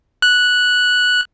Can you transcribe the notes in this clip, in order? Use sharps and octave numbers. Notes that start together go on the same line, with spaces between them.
F#6